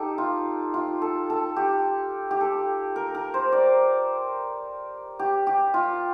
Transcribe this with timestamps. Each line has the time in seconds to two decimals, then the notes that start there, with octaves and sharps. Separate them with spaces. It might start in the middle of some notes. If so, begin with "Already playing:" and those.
Already playing: D#4 G4 A4
0.18 F4
0.74 F4
1.02 A4
1.30 A4
1.56 G4
2.31 G4
2.41 A4
2.96 A#4
3.15 A#4
3.34 C5
3.52 D5
5.19 G4
5.47 G4
5.74 F4